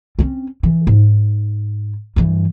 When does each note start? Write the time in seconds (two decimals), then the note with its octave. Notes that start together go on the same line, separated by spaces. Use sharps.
0.19 C4 C#4
0.63 E3
0.87 G#2
2.16 G2 E3